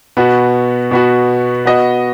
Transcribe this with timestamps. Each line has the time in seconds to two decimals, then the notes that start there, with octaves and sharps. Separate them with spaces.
0.17 B2 B3 F#4
0.91 B2 B3 F#4
1.66 B3 F#4 D#5